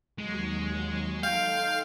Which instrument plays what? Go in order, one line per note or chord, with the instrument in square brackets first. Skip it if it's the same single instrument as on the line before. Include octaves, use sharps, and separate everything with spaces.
[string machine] D#2 F#3 C#6 [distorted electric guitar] G#3
[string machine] D#4 A4 C6 [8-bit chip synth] F5 [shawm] G5